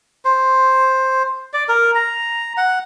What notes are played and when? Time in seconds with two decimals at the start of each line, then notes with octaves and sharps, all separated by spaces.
0.25 C5
1.54 D5
1.69 A#4
1.95 A#5
2.57 F#5